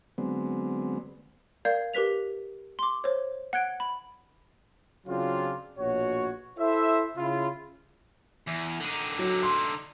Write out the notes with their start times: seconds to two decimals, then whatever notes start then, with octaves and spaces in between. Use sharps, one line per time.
0.18 D3 F#3 G#3 B3 C4
1.65 A#4 D5 F5 G6 G#6
1.94 G4 A#4 B4 B6 F7
2.79 C6 D6
3.04 C5 C#5
3.53 F#5 F#6 G#6 D7
3.80 B5
5.07 C#3 F#3 C4 D4 F4
5.78 A#1 B2 F#4 C#5
6.59 E4 A4 C5 E5
7.17 C#3 E4 F4
8.47 E2
8.80 D3 D#4
9.19 F#3
9.43 C6